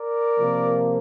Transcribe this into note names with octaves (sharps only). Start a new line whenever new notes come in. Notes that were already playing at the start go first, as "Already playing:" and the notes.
Already playing: A#4 D5
C3 F3 A#3